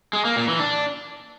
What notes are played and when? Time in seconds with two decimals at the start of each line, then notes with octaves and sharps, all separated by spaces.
0.13 G#3
0.25 A#3
0.36 A#2
0.48 E3
0.59 D4